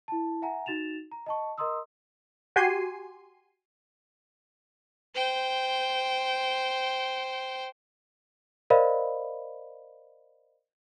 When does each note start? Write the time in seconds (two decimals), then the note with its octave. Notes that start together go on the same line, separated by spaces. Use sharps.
0.08 E4 A5
0.42 E5 F#5 G#5 A#5
0.66 D#4 F#4 A6 E7 F7
1.12 A#5
1.26 D#5 A5 C#6
1.58 A#4 D#5 A#5 C6 D#6 E6
2.56 F#4 G4 G#5 C6 C7 D#7
5.15 C5 G5
8.70 A#4 C5 D5 D#5 F5 B5